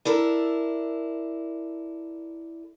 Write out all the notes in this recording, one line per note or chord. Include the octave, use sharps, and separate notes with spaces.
D4 E4 A4 A#4